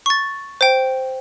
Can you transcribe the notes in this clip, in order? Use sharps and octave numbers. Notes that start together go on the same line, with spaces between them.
C#6 A6
C5 G5